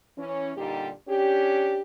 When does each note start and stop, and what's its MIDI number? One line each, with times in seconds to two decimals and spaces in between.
0.18 0.51 52
0.18 0.51 61
0.56 0.89 46
0.56 0.89 50
0.56 0.89 55
0.56 0.89 63
0.56 0.89 67
1.08 1.81 61
1.08 1.81 62
1.08 1.81 67